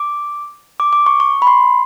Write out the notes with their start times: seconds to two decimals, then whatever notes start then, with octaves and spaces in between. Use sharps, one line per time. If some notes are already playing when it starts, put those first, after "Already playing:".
Already playing: D6
0.80 D6
0.93 D6
1.06 C#6
1.20 C#6
1.42 B5
1.47 C6